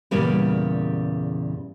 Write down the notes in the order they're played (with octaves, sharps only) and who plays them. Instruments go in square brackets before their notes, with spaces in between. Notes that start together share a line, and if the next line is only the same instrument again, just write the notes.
[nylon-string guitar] E2 A#2 C#3 G3 A#3 B4